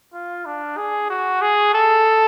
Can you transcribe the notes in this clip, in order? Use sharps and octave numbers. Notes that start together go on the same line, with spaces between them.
F4
D4
G#4
F#4
G#4
A4